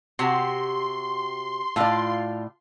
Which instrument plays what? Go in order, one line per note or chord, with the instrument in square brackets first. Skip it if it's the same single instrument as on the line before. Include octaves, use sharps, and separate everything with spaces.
[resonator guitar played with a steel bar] C3 [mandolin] F#4 G4 [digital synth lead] C6
[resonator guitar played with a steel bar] A2 D5 [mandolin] F4 A5